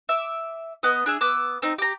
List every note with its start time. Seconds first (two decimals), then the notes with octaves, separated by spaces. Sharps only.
0.09 E5 D6
0.83 B3 D#5
1.06 D4 G#4 E5
1.21 B3 D6 E6
1.62 C4 D#4
1.78 G4 A#5